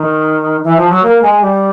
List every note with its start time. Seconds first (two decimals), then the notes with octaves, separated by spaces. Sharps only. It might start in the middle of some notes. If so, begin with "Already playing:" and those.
Already playing: D#3
0.64 E3
0.77 F3
0.89 F#3
1.03 A#3
1.22 G#3
1.42 G3